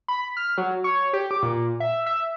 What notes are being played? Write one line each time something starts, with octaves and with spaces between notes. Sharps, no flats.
B5
F6
F#3
C#5
G4
D6
A#2
E5
E5